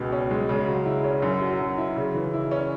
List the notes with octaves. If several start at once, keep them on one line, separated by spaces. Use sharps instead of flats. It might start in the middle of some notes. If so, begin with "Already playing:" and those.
Already playing: C#2 B2
C#4
G#3
C#3
F#3
E4
C#4
F#2
F#3
F#2
E4
C#3
E3
E4
C#4